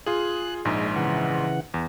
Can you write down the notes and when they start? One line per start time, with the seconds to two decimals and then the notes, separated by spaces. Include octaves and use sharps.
0.06 F4 G#4 F#6
0.65 A#1 G#2 G#3
0.96 C#3 E3 F#5
1.74 E2